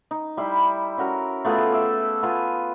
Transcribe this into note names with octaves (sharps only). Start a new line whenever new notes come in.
D#4
G3 E4 B5 C6
C#4 F#4 A#4
A3 B3 F4 G#4
E5 D6
B3 F4 G#5